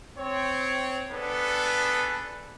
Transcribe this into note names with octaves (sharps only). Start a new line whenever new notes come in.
C4 C#5
B3 D4 G#4 A4 B4